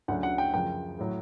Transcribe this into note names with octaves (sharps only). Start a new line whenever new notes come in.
D2 C#3 F#3 F#5
F#5
G5
F#2 C#3 F3 G5
A2 F#3